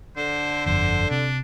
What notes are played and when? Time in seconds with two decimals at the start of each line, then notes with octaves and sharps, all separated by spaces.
0.17 D3 C5
0.66 G1 F2 C5
1.11 C3 D4